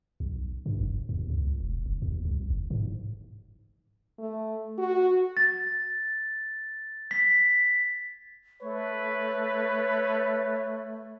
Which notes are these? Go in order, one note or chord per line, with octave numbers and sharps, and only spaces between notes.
B1
G2
F#1
D#2
C#2
E1
F#1
D#2
C2
F#1
G#2
A3
F#4
A6
B6
A3 B4 C#5